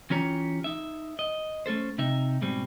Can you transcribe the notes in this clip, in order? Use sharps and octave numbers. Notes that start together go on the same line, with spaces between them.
E3 C#4 F4 G4 C#5 A#5
D#4 E5
D#5
A3 C#4 A4 C5
C3 D#4 E5
G#2 B2 G3 C4